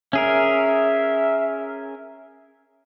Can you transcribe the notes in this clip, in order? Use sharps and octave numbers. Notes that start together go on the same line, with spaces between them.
C#4 G#4 A#4 E5